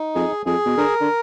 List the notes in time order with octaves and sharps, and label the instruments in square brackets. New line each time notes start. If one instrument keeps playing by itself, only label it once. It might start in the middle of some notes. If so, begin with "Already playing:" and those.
Already playing: [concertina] D#4
[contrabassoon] F2 [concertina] G#4
[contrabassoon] F2 [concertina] G#4
[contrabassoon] B2
[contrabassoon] D3 [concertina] A#4
[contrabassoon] D3